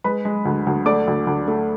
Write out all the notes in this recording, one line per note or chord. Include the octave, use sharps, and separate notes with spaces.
G#3 B4 B5
G#3
D2
D2
A3 D5 D6
D2
D2
A3